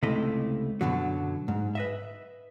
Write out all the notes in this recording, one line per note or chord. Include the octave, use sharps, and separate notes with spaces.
C#2 C3 A3 E4 D#5
F#2 B2 D3 F#3
G#2
B4 D#5 E5